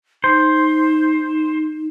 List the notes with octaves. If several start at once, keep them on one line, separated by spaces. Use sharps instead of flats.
D#4 C5